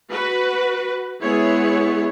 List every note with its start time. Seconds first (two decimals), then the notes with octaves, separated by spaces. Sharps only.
0.11 F#4 B4
1.22 G#3 B3 E4 G#4 C#5